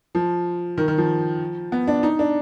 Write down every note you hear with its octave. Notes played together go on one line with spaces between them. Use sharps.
F3
D#3
D#3
F3
B3
D4
D#4
D4